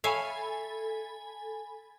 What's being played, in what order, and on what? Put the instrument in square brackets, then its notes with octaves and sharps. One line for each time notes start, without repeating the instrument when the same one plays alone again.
[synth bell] A4 G#5 B5 [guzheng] C#5 E5 F5